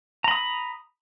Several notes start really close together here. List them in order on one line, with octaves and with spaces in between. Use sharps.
A#5 B5 D#6